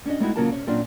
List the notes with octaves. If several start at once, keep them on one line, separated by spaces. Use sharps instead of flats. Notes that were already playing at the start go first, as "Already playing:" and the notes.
C#4 D4 F#4 D#5
G#3 A3 C4 D#4 E4 F#4
C#3 F#3 A#3 F4 A#4 A5
C3 C#4
F#2 A#2 F#3 C4 D4 F4